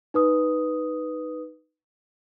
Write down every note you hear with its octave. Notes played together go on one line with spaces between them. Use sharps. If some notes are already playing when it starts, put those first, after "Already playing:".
D#4 B4 D#6